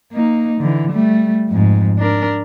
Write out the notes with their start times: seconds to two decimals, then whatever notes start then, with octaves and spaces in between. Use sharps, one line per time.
0.12 A#3 D#4
0.61 D3 E3
0.91 G3 A3
1.48 F2 G#2
1.99 D4 A#4